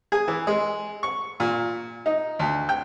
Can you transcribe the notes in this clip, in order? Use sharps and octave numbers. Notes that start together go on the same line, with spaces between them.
G#4
E3
G#3
C#6
A#2
D#4
D2
G5